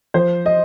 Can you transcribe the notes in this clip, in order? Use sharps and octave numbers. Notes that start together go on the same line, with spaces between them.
F3 C5
D#5